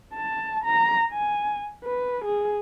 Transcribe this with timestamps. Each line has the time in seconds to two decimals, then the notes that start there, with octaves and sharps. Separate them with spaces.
0.14 A5
0.64 A#5
1.12 G#5
1.85 B4
2.25 G#4